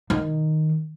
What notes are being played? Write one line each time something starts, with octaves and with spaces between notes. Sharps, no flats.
D#3